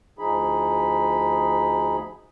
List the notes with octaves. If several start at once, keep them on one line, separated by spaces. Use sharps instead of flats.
D2 F3 D#4 G#4 B5